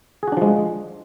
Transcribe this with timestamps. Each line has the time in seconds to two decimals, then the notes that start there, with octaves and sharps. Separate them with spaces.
0.23 G#4
0.28 F#4
0.32 D4
0.37 F3
0.42 G#3